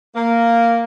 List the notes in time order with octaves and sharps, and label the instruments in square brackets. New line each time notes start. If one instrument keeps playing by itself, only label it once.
[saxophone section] A#3